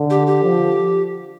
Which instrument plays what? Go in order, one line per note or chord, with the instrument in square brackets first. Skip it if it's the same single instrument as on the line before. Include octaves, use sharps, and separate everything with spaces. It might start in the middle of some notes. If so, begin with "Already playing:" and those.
Already playing: [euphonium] D3
[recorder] G4
G4
[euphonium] F3